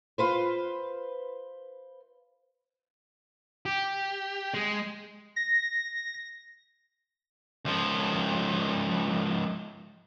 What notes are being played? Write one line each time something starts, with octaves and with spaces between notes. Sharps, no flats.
F4 B4 C5
G4
G#3
A#6
C#2 F3